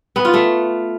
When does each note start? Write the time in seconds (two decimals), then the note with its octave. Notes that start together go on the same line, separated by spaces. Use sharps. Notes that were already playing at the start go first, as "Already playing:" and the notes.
0.16 B3
0.25 F4
0.34 A3